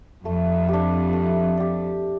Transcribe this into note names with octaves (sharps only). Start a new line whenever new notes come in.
F2 A3
D4 G4
A3
D4 G4